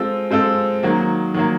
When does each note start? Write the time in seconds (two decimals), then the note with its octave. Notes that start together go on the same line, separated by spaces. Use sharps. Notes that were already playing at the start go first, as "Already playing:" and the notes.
Already playing: G#3 C4 F4 A4
0.31 G#3 C4 F4 A4
0.83 D#3 F#3 A#3
1.34 D#3 F#3 A#3